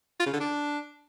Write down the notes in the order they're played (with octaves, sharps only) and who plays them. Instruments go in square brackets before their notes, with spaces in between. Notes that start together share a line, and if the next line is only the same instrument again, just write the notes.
[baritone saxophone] F4
C#3
D3
D4